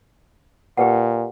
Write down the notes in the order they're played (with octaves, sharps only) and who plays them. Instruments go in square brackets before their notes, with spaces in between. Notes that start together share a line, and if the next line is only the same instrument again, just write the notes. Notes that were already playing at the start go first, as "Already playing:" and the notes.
[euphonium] A#2 [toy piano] G4 B4 F#5